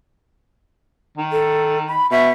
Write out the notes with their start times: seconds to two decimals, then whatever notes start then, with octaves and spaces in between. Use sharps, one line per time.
1.18 D#3
1.32 A4
1.88 B5
2.11 B2 E5